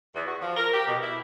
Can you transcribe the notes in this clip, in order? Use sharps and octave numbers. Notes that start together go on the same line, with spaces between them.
E2
F#4
F3
A#4
G4
B2
E4